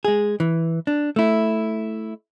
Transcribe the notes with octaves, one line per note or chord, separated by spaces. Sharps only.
G#3 G#4
E3
D4
A3 E4